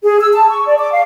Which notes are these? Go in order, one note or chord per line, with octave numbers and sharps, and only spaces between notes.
G#4
E6
A5
C#6
D5
D6
F5